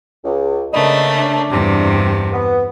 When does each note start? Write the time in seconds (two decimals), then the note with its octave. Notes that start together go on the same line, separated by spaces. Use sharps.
0.24 C#2
0.73 C#3 A3 A#3 D4 B4 D#5
1.17 D4
1.51 E2 G2 C3
2.32 B3